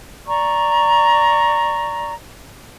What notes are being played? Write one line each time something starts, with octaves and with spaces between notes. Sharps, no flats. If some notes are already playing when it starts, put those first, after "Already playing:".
D5 A#5 C#6